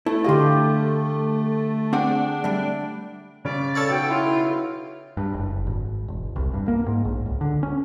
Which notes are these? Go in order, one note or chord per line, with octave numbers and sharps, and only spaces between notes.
A3 E4
D3 G4 D#5 F5 C6
C4 D4 G#4 F#5
G3 A3
C#3 C#4 D5 D7
A4 C#5 F5
B1 G5
E4 F4
G2
F#1
G#1
E1
C2
G2
A#3
G#2
A#1
C#2
D3
C#4